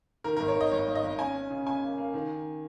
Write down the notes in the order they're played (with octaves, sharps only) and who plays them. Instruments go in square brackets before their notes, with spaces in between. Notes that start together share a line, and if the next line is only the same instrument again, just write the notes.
[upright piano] D#3 A#4
G#1 A#4
C#5
D#3 D#5
G#1 C#5
G#1
D#5
G#1
C#4 G#5
C#4
C#3
C#3 G#5
A#3
A#3
D#3